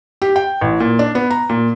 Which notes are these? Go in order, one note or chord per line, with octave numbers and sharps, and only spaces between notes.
G4
G5
A1
A#2
D4
B3
A#5
A#2